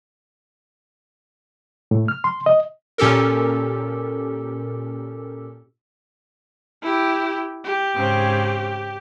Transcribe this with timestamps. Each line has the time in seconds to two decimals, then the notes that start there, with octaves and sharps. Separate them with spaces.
1.91 A2
2.08 F6
2.24 C6
2.46 D#5
2.98 A#2 C#4 G4 A4 A#4
6.82 E4 G4
7.65 G4
7.95 G#2 C#3 C4